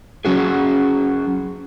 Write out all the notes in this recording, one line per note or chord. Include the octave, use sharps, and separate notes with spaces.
F#3 C#4 F#4 G#4